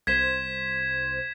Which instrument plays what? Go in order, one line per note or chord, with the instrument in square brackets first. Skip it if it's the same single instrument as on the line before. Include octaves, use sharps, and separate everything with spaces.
[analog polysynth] C2 C5 [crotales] G#6 B6 E7